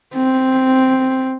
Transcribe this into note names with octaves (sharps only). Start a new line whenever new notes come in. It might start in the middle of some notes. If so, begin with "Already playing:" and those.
C4